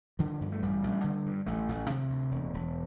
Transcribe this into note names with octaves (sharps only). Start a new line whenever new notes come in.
D3 F3
G2
A3
A1 G3
A1
D3
G2
A1 A3
A1
C3
D2
E1
E1